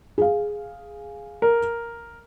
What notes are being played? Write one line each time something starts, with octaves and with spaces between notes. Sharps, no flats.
G#4 F5
A#4